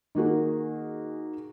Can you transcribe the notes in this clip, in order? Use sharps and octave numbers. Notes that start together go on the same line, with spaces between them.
D#3 A#3 F#4 G#4